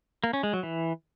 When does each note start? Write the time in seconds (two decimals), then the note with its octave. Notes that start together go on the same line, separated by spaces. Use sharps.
0.24 A#3
0.33 C#4
0.43 G#3
0.53 F#3
0.63 E3